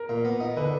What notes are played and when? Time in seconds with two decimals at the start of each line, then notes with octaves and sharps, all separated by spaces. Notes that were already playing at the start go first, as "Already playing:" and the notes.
Already playing: A#4
0.09 A#2
0.25 B3
0.40 D#4
0.57 D3 B4